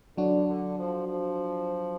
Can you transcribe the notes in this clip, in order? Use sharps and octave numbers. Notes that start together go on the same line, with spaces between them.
D3 F#3 D4 F#4
D3
F3
F3